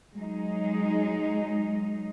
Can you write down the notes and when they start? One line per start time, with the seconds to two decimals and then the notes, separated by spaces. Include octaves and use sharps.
0.15 F#3 G#3 D#4